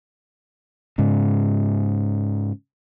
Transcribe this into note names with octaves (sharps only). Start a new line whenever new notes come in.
G#2 C#3